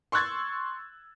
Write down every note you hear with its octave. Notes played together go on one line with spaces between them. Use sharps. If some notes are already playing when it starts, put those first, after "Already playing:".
C6 C#6 E6 F#6 G#6 A6